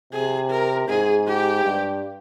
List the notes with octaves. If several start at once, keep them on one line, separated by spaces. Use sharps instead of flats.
C3 G#4
A#4
G#2 G#4
G4
G2